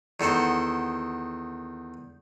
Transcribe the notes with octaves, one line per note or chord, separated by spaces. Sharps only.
E2 D#3 A4 C5 F#5